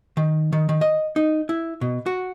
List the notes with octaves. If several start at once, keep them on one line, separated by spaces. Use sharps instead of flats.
D#3
D#3
D#3
D#5
D#4
E4
B2
F#4